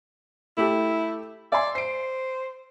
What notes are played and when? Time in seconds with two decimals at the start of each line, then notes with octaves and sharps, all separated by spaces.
0.57 A3 E4 G4 A4
1.52 D5 E5 G#5 C6
1.75 C5 C7 D7